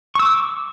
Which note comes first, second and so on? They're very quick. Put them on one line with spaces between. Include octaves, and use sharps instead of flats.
C#6 E6 D6